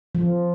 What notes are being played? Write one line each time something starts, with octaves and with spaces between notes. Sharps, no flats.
F3